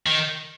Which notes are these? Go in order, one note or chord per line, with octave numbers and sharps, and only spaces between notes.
D#3